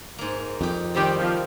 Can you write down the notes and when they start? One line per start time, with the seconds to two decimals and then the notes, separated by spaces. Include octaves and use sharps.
0.19 G#2 A#3
0.61 F2 D#4 G4
0.94 D#3 G3 C4 G4
1.18 F3